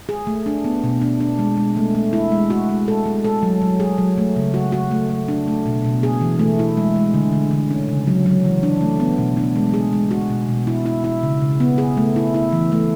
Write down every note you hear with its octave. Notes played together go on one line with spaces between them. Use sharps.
G#4
A3
D4
B3
B2
D4
D4
G#3
G#3
A3
A3
E4
G#3
F#4
G#3
A4
G#3
A4
F#3
F#3
G#4
F#3
A3
C#3
F#4
F#4
A3
A3
D4
A3
B2
B2
G#4
E3
A3
E4
G#3
G#3
D3
D3
D3
C#4
C#3
F#3
F#3
E3
D4
A3
B3
B2
D4
G#3
G#4
G#3
F#4
B2
B2
E4
E4
E4
C#3
C#3
B3
G#4
A3
E4
E4
E3
A3